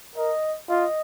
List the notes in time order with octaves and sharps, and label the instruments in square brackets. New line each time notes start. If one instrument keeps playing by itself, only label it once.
[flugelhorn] A#4 [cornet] D#5
[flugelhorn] F4 [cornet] D#5